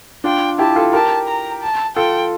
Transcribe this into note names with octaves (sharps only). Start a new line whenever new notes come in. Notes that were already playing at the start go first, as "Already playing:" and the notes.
D4 F4 G5
E4 G4 A5
F4 A4
G4 A#4 A5
A#5
A5
F4 A4 G5